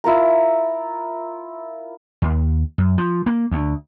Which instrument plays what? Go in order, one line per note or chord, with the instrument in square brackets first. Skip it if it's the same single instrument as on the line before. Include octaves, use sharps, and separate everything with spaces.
[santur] E4 F4 A#4 A#5
[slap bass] D#2
F#2
F3
A#3
D2